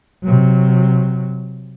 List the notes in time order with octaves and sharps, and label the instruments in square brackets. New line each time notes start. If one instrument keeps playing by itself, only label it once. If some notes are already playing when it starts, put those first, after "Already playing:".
[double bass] C3 F#3